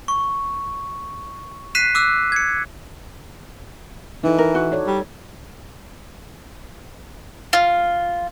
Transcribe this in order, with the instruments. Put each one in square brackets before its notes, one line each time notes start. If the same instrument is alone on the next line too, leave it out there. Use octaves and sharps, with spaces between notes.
[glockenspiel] C#6
F#6 B6 C7 D#7 E7
D6 E6 F#6
G#6 C#7
[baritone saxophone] E3 [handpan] D#4 E4 A4
[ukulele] A#4
F#4
[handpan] A4 C#5 D5
[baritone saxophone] G3
[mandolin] F4